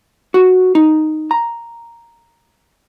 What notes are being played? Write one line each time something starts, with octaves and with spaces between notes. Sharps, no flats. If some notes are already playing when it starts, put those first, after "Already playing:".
F#4
D#4
A#5